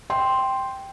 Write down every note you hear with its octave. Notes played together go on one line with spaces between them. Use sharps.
G5 C6